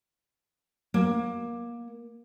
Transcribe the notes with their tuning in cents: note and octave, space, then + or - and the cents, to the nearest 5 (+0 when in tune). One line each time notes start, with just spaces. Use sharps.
A#3 +20